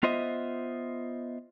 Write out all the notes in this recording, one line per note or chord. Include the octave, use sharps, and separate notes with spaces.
B3 F4 C5 D#5 E5